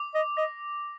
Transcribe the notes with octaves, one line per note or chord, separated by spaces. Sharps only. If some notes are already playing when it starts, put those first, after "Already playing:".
Already playing: D6
D#5
D#5 A#6